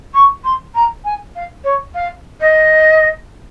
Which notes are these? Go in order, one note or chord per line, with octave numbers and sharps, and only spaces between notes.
C#6
C6
A#5
G#5
F5
C#5
F5
D#5